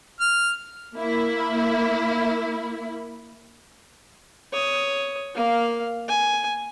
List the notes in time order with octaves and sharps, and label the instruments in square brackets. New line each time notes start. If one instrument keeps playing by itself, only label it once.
[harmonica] F6
[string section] A#3 E4
[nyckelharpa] C#5 D#6
A#3 F5
G#5